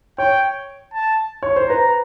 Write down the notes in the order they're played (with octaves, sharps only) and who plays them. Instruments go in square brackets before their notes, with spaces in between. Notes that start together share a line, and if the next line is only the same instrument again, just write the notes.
[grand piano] C#5 [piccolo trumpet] G5
[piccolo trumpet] A5
[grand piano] C#5
C5
[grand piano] B4 [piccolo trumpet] A#5